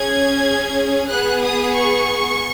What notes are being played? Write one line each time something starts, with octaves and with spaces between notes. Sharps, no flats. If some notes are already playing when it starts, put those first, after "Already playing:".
Already playing: C#4 G#4 G#6
B3 G#4 F#6
D#6
C#6